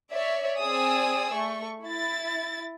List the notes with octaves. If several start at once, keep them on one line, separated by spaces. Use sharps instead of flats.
C#5 D5 E5
C4 G#4 D5 G#5 D#6 E6
A3 C#6
E4 A6